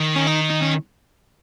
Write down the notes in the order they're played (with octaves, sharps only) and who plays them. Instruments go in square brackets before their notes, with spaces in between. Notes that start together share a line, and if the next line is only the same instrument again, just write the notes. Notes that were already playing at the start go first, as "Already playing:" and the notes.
Already playing: [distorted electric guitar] D#3
[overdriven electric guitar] C#4
D#4
D#4
C#4